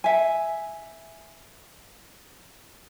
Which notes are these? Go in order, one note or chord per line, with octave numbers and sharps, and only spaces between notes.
E5 G#5